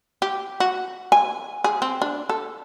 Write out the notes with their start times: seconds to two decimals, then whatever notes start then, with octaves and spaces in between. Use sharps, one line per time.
0.22 G4
0.60 F#4
1.12 G#5
1.64 G#4
1.82 C4
2.02 D4
2.29 A4